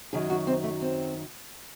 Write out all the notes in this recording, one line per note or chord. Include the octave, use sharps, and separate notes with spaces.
F#2 D#3 F#3 G#4
F#4
C4
A3
C4